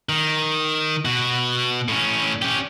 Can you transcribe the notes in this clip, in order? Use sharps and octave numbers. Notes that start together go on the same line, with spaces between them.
D#3
B2 F#4
A2 C#4
C#4 G4